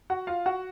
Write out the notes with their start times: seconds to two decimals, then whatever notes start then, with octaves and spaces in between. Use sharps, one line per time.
0.10 F#4 F#5
0.27 F4 F5
0.46 F#4 F#5